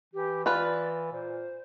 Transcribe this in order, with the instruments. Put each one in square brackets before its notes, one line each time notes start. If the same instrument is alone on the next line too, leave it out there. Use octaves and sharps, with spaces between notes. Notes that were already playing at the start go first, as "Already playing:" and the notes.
[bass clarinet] E3 [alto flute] G4
[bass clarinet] E3 [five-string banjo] F4 B4 [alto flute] D5
[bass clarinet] A#2 [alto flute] C5